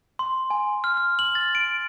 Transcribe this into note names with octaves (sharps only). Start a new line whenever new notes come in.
C6
G#5
F6
F6
F#7
A6
D7